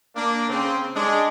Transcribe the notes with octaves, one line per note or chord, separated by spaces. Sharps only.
A#3 D4
C#3 C4
G#3 D4